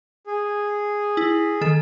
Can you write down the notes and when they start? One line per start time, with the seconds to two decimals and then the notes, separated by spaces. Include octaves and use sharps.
0.27 G#4
1.17 E4
1.61 D#3 A4